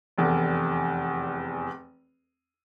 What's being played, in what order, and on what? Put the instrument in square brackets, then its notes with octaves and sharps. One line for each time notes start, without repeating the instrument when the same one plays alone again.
[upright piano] F1 E2